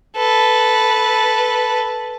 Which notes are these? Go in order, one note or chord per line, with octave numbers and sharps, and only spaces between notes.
A4 B4